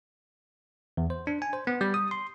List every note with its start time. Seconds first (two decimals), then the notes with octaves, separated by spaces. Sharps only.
0.97 E2
1.10 C5
1.27 D4
1.42 G#5
1.53 C5
1.67 B3
1.81 G3
1.94 D#6
2.11 C6